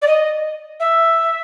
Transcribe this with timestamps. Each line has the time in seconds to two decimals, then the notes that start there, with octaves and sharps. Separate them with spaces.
0.01 D5
0.06 D#5
0.79 E5